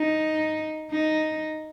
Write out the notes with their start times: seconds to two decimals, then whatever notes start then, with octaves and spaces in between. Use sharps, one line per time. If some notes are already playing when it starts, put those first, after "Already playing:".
Already playing: D#4
0.91 D#4